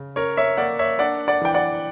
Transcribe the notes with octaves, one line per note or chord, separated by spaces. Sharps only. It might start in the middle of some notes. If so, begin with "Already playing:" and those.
Already playing: C#3
C#4 A#4 C#5
C#5 E5
A#3 D5 F#5
C#5 E5
D4 D5 F#5
D5 F#5
E3 G5
D5 F#5